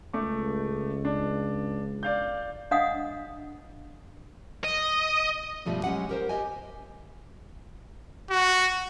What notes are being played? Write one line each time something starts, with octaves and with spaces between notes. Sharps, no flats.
C#2 A3 D6
D4
D5 F5 G6
D4 D#5 F5 F#5 G#5 D#6
D#5
G2 B2 F3 G3 A3 D4
F#3 G#3 C#4 G4 F#5
G4 A#4 C5
G4 D#5 G#5
F#4